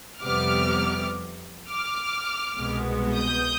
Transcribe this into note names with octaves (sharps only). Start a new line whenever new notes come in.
F2 C3 G3 B3 D6 F6
D6 F6
C2 B2 G#3 B3
D#6 G6